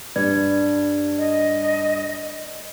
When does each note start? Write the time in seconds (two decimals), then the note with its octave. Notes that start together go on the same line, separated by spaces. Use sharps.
0.16 G2 B4 D5 G#6
1.18 D#5